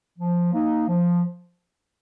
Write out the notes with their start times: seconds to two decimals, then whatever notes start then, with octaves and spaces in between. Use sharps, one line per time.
0.19 F3
0.53 A#3 D#4
0.88 F3